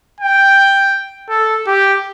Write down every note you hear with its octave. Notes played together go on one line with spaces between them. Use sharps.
G5
A4
G4